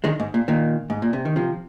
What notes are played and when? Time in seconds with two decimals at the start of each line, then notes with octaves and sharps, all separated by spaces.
0.04 D#3 G#3
0.20 G#2
0.34 A#2
0.48 A#2 D#3
0.90 G#2
1.02 A#2
1.13 C3
1.25 D#3
1.36 C3 F3